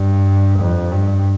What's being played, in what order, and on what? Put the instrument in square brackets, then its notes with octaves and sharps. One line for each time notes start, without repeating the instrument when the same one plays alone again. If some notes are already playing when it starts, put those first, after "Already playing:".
Already playing: [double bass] G2
F2
G2